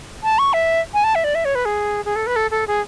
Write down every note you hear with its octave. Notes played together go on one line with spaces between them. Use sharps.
A5
C#6
E5
G#5
A5
E5
D5
E5
C#5
B4
G#4
G#4
A4
B4
A4
A4
G#4